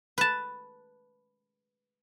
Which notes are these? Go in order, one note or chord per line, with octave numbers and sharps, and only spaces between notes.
B4 A5